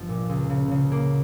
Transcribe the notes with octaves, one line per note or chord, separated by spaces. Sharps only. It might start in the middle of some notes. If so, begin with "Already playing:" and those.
Already playing: G1 F3
A#2
C#2
C#3
C#3
A#3